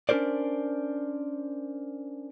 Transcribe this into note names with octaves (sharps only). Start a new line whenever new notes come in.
C#4 D4 F#4 A#4 C5 D5